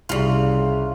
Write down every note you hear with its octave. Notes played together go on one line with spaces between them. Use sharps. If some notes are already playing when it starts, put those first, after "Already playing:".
C2 C#3 F4 D5